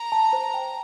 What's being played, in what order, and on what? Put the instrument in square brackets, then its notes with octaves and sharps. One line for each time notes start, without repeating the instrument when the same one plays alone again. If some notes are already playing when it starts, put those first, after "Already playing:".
Already playing: [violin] A#5
[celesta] A5
C5
G5